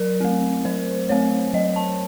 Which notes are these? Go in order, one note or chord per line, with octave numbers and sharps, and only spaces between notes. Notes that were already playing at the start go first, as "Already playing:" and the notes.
Already playing: F#3 A#4
A3 C4
F#3 C5
A3 C4 C#5
F#3 D#5
A5